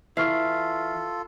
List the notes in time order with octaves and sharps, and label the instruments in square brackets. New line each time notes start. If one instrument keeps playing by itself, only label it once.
[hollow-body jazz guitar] E3 [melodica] F4 A4 [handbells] E5 [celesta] C#6 F6 C7